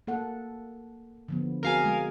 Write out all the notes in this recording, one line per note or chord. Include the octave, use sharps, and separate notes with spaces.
A#3 A4 F#5
D3 F3 B3
C4 F#4 G#4 A#4 F5 G#5
G#3